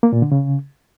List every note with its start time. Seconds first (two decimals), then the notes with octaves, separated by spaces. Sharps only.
0.03 A#3
0.13 A#2
0.22 D3
0.32 C#3